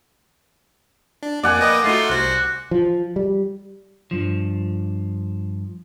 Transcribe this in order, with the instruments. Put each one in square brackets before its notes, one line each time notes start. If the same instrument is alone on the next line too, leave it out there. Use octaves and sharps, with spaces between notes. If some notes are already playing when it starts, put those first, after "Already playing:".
[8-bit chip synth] D4
[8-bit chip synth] F2 A#3 [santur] D5 F#5 G#5
[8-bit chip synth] A#3 B4 G5 [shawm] D#5
[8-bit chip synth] A3 D#4 F#4 [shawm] F4
[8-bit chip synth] C2 C5 [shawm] F#4
[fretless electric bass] F3
G3
[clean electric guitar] G2 F3